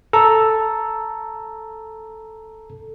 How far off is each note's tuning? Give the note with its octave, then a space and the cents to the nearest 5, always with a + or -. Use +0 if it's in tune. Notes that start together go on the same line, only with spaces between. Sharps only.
A4 +0 A#5 +0